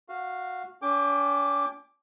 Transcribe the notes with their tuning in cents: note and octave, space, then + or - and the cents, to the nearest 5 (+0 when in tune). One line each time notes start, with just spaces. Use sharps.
F#4 -15 F5 +0
C#4 +45 G5 +35 D6 +0